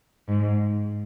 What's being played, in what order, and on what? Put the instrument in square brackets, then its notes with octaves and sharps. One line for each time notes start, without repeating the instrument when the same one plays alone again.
[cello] G#2